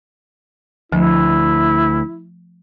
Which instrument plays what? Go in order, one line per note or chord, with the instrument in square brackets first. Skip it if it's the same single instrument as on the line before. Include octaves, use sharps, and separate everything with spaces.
[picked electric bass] D2 [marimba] F3 A3 [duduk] E4